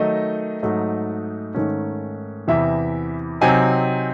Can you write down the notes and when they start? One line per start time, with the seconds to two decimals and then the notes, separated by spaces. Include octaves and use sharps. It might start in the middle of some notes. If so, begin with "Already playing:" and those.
Already playing: D#3 F#3 A3 D#4 D#5
0.63 G#2 F#3 A3 D#4
1.54 G#2 D#3 A3 C#4
2.48 E2 C3 E3 E5
3.41 C3 F#3 C4 D#4 G#5